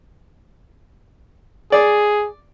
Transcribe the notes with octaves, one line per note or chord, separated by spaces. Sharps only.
G#4 D5